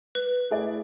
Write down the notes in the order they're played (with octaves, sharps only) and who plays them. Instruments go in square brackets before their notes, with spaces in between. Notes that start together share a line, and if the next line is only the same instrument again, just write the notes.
[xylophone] B4
[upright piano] A3 E4 G#4 D5